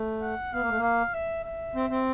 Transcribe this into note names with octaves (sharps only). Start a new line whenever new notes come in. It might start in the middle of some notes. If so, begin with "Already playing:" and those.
Already playing: A3
F#5
B3 F5
A#3
A3
A#3
F5
E5
E5
C4
C4